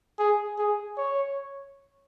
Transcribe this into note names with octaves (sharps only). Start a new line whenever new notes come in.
G#4
G#4
C#5